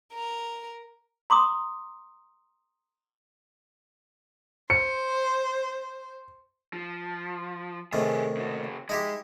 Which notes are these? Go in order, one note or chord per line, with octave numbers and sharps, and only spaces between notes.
A#4
A#5 C6 D6 D#6
C5 C#7
F3
A2 C3 D#3 A3 G#4
C#3 F#4
G#3 D#4 E4 G4